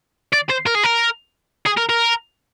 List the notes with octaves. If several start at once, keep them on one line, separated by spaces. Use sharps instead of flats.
D5
C5
A#4
G#4
A#4
G#4
A#4
A#4